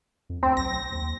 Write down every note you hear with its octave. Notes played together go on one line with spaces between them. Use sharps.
F2
D2 C4
B1 A#6
D#2